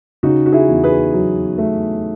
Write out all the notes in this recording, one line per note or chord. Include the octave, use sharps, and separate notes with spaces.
C#3 D#4 F#4
F#4
E4 G#4
E2
G#4 B4
F#3
A3